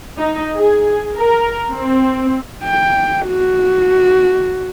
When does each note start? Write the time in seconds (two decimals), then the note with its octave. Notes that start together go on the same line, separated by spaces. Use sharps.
0.17 D#4
0.54 G#4
1.17 A#4
1.71 C4
2.64 G5
3.27 F#4